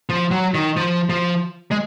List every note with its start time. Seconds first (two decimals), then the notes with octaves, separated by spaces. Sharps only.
0.09 F3
0.31 F#3
0.54 D#3
0.77 F3
1.09 F3
1.71 G#3